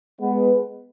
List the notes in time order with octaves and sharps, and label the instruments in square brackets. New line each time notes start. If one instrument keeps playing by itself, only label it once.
[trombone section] G#3 B3